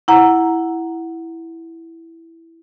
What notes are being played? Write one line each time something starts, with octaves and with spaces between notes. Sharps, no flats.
E4 F#5 A#5